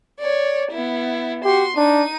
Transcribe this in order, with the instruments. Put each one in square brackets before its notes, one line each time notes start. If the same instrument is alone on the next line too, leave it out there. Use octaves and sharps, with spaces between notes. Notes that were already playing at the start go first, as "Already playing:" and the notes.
[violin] C#5 D5
B3 E4
[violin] F#4 C6 [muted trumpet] G4
[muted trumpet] D4 [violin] D#4 D#7